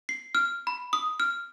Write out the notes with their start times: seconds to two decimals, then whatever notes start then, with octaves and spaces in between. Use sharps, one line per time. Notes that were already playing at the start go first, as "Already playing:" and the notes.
0.09 C7
0.35 F6
0.67 B5
0.93 D#6
1.20 F6